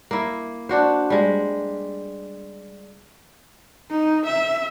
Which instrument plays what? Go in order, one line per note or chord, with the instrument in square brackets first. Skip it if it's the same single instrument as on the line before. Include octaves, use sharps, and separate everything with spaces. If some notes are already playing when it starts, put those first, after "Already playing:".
[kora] A#3 E4
D4 F#4 C5
G3 G#3
[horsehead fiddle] D#4
E5